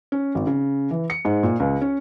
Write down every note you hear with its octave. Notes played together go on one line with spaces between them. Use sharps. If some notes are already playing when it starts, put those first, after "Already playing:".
C#4
G#1
C#3
E3
C#7
G#2
A#2
C#2
C#4